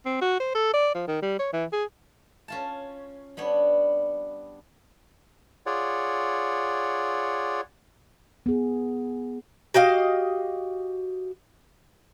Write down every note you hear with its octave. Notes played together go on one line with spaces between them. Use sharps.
C4
F#4
C5
A4
D5
F3
D#3
G3
C#5
E3
G#4
C#4 F4 A5
G3 B3 D4 C#5
F4 G#4 C#5 D5 F#5
B3 G#4
F#4 G4 D#5 F5